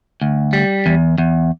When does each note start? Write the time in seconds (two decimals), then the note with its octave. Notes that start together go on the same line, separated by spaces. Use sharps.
0.22 D2
0.53 G3
0.86 E2
1.18 E2